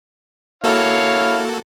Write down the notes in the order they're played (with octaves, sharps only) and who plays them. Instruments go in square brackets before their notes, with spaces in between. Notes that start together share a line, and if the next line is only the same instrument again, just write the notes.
[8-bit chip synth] A#3 F#4 A4 [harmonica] E4 C#5 F5